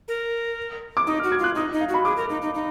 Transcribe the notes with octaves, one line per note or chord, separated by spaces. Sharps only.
A#4
D6
D#4 D#6
F#4 F6
G#6
F4
F#6
D#4 D#6
D#4
F5
F#4
B5
G#4 D6
A#4
D#4
D#4
D#4